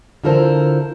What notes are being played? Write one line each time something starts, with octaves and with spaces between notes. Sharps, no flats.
D3 E4 F4 A4 A#4 C5